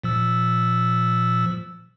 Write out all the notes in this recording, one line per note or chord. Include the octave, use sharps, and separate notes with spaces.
A#2 F3 E6